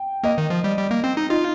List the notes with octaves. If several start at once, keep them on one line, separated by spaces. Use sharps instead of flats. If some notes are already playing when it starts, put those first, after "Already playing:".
Already playing: G5
A#3 D#5
D#3
F3
G3
G3
A#3
C4
D#4
D#4 F4